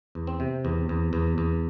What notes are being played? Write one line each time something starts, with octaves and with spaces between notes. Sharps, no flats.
E2
C4
C3
E2
E2
E2
E2